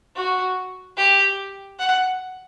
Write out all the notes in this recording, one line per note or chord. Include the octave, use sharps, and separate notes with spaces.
F#4
G4
F#5